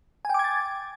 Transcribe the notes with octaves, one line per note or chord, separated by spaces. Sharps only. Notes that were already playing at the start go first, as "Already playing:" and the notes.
G5 G#5 D6 G#6 A6